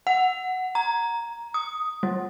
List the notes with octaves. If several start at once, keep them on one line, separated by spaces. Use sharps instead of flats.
F#5
A#5
D#6
G3